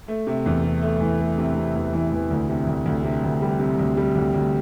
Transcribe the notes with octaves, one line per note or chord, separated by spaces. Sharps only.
A3
C3
E2
C3
A3
E3
A3
C3
C3
E2
E3
E3
D2
C3
D2
D2
C3
D2
G3
C3
D2
G3
D2
D2